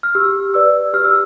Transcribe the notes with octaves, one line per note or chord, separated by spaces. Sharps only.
F6
G4 E6
B4 D5 E6
G4 F6
E6